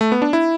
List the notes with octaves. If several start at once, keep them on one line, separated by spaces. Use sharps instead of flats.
A3
B3
D4
E4